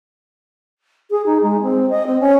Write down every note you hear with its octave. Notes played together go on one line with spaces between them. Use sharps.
G#4
D#4
G#3
C4
D#5
C4
C#4